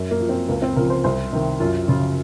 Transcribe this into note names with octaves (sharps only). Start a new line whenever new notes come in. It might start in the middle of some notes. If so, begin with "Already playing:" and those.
Already playing: F#2
A#3
F3
C4
C#2 A#3
C4
C#3 F3 A#4
C5
C2 C5
C3 D#3
F#2 F4
C#3 F3 F4